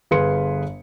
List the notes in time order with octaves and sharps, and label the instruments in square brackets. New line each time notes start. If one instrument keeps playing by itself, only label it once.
[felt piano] G1 G#4 B4 F5 C6 C#7